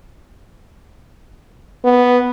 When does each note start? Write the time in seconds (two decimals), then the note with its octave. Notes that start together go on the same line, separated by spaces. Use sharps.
1.84 B3